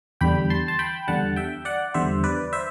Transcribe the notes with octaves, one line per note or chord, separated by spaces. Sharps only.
E2 D3 G3 G5 B5
A5 C6
A5
G5 B5
E2 D3 G3 F#5 A5
E5 G5
D5 F#5
E2 D3 G3 C5 E5
B4 D5
C5 E5